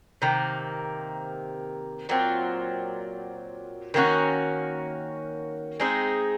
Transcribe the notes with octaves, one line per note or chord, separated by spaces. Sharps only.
C3 D#3 A#3
A#2 F#3 C4 F4
D#3 A#3 C#4 F#4
G#3 C4 D#4 G#4